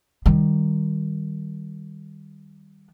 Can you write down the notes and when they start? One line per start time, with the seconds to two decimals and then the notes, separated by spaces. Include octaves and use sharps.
0.26 D#3 G3